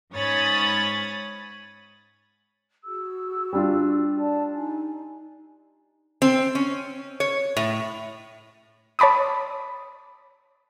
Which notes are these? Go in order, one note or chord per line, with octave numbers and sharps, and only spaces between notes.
G#2 C#4 C#5 B5 D#6 A6
F#4 G#4 E6
G3 D4 F4
D5 A5
D#4 G#5
C4
C#4
C#5
A2
C#5 A5 B5 D6 D#6